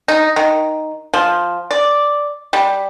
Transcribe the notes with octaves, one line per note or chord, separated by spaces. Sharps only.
D#4
D#3
F3
D5
G3